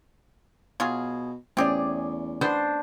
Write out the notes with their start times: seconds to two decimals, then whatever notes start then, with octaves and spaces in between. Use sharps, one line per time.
0.80 B2 F#3 F4 G#4
1.57 E2 A3 C4 C#4 G4 G#4 D5
2.41 B3 D4 C5